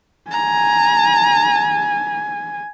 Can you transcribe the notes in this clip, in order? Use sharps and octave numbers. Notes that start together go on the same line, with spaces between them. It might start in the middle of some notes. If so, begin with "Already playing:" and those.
G#5 A#5